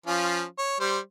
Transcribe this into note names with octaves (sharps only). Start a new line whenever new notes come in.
F3 C#4 F4
C#5
G3 C5